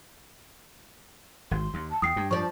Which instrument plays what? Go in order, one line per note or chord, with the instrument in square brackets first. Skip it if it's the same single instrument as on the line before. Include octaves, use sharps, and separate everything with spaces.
[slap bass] G#1 [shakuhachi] C6
[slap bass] D#2
[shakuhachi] A5
[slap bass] E2 [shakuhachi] G5 [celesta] D#6 C7
[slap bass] G2
[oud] F3 D5 [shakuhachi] C5 [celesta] C#6